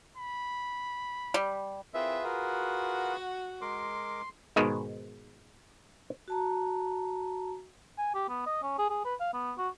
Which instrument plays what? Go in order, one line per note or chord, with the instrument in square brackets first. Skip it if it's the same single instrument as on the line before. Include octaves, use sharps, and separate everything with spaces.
[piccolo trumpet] B5
[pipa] G3
[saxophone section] C4 E4 A#4 [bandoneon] F4 G#4 B4 [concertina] E5
[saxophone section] F#4 [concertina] A#4
[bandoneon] G#3 A#4 D6 [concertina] C6
[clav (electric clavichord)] G#2 B2 D#3 G#3
[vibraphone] F#4 A5 A#5
[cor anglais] G#5
G4
B3
D#5
C#4
G#4
G#4
B4
F5
B3
F#4